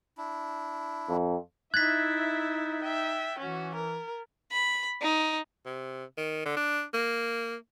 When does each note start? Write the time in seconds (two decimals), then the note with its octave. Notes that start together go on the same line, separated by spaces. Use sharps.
0.18 D4 E4
1.09 F2
1.74 D#4 E4 E5 F#6 G#6 A6 B6
2.82 E5 G5
3.39 E3 C#4 F#4
3.75 A#4
4.52 B5
5.01 D#4
5.66 C3
6.17 D#3
6.45 D3
6.56 D4
6.94 A#3